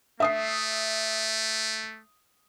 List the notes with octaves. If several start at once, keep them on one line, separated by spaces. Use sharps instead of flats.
A3 E5 D#6 C7